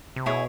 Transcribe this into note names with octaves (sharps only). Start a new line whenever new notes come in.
C3
B2 E4 G#4 C#5